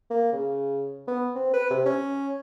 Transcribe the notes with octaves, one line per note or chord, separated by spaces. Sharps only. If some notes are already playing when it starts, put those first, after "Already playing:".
A#3
C#3
B3
C4
B4
C3
C#4